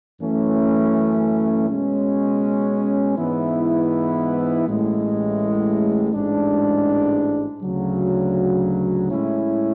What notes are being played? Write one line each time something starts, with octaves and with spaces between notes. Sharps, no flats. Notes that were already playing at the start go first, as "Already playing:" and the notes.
F#2 E3 A3 C#4
B2 G#3 C#4
G#2 E3 B3 E4
A1 A2 G#3
A1 G#2 G#3 D4
D2 C#3 F#3
A2 G#3 C#4 E4